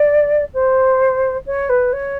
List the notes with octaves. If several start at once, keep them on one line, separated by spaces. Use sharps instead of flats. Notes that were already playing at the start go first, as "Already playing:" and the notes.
Already playing: D5
C5
C#5
B4
C#5